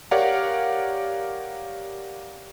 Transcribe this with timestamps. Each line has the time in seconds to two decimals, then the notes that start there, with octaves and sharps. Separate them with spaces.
0.11 G4 A#4 C#5 D5 F5 F#5